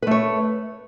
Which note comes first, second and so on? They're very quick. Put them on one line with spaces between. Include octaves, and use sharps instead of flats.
B4 A3 C#5